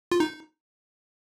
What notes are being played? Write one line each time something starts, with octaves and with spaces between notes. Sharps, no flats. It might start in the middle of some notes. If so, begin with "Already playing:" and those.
F4
D#4